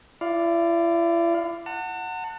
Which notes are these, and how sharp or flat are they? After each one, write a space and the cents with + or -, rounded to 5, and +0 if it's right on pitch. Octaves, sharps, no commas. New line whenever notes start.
E4 +40 D5 +0 F5 +10
F#5 +0 A5 +40